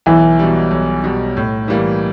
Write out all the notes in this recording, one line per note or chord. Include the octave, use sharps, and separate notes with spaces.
B1 E3
B2 G3
B1
B2 G3
A2
E3 G3 A#3